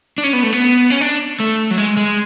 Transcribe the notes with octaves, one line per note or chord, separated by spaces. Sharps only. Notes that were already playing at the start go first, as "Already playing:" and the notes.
D4
C#4
B3
A3
B3
C#4
D4
A3
F#3
G#3
G#3